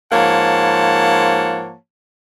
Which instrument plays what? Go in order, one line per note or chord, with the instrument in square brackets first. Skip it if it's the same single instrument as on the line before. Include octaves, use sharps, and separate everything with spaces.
[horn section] G#2 F3 A#3 C#5 F#5 A5